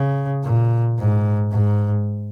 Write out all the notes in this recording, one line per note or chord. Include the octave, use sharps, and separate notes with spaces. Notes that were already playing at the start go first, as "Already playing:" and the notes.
Already playing: C#3
A#2
G#2
G#2